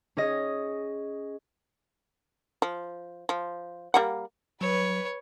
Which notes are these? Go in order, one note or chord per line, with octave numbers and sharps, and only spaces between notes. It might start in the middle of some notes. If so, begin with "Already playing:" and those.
C#4 G#4 D#5
F3
F3
G3 A#3 F#5
F#3 B4 C#5